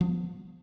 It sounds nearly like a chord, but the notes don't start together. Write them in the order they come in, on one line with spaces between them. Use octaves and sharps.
F3 C#4 G3 B3